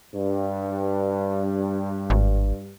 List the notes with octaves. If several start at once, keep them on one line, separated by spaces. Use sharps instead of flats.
G2
G#1